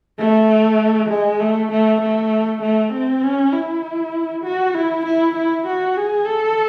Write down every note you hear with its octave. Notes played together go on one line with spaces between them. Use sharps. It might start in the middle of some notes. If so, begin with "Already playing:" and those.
A3
G#3
A3
A3
A3
A3
C4
C#4
E4
F#4
E4
E4
E4
F#4
G#4
A4